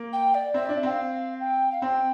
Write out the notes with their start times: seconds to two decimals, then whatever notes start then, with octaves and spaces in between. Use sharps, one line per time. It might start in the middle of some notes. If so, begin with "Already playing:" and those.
Already playing: A#3
0.12 G5
0.34 D5
0.54 C4 E5
0.65 D4 D5
0.76 E5
0.83 C4 G5
0.91 F5
1.40 G5
1.71 F5
1.82 C4 G5